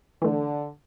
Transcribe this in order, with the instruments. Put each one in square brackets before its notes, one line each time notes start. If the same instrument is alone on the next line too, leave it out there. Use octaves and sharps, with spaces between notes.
[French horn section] D3 [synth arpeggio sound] E3 A3